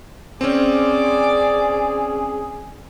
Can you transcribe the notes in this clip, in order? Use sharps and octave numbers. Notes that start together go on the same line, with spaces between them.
C4 C#4 G#4 D5 D6